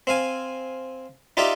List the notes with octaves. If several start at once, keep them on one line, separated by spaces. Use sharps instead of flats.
C4 F5 G#5
D#4 F4 G4 D5 E5